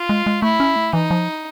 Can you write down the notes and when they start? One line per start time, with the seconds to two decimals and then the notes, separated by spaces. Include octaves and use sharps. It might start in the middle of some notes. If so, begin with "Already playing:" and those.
Already playing: F4
0.09 G#3
0.26 G#3
0.42 A3 E4
0.60 C#4
0.76 A3
0.93 E3 D#4
1.11 F3